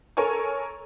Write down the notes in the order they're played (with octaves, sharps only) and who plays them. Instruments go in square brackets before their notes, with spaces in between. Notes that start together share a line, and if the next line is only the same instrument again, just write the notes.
[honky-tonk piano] A4 A#4 C#5 G#5 C#6